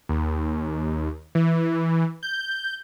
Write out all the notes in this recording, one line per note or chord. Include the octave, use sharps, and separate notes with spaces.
D#2
E3
G6